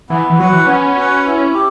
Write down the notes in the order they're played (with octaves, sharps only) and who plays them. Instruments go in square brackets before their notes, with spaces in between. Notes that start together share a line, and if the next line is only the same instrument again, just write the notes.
[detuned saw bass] E3 [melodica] B3
[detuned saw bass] E3
[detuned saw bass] F#3 [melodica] F#4 B4 F#5
[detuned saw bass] E3
[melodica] B3 [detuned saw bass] C#4
[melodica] F#4 B4 F#5
E4
G4